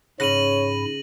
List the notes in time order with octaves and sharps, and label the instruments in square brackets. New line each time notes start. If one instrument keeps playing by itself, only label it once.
[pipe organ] G#2 B5 [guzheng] C#3 F#5 [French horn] C#5 [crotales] A#6 D#7 F#7